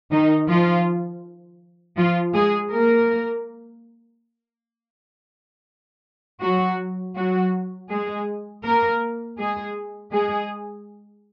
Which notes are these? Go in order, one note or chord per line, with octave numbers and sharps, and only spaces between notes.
D#3 D#4
F3 F4
F3 F4
G#3 G#4
A#3 A#4
F#3 F#4
F#3 F#4
G#3 G#4
A#3 A#4
G#3 G#4
G#3 G#4